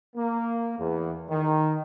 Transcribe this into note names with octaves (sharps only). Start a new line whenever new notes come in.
A#3
E2
D#3